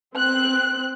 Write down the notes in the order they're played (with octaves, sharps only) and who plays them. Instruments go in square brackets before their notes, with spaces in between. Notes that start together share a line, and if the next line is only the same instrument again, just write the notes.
[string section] C4 F#6